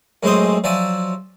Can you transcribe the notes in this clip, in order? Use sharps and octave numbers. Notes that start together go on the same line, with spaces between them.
F#2 A2 G#3 C4 C5 D#6
F3 F#3 D5 E5 G#5